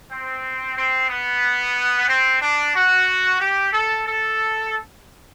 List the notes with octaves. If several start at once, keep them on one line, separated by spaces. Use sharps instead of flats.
C4
C4
B3
C4
D4
F#4
G4
A4
A4